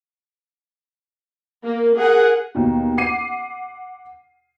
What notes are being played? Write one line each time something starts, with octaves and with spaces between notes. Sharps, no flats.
A#3
G#4 A#4 F#5
D#2 B2
F#5 D6 C7 D#7